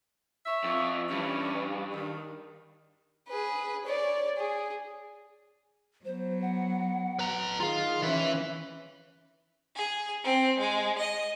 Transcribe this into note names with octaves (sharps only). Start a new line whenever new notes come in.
C#5 E5
F2
G2 E3 C#4
D#3
G#4 B4
C#5 D5
G#4
F#3 B3 C5
F#5
B4 A#5
D#3 F4 G#4 F5
E3 C#4 B4 E5
G#4
C4
G#3
D#5